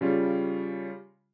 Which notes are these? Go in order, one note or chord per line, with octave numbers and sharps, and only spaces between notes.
C#3 G3 F4